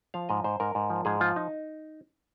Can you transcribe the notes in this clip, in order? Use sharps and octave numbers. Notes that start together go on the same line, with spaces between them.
F3 F5
G#2 D#5
G#2 C5
G#2 A#4
G#2
F3
G#2 G#4
F3 F4
D#4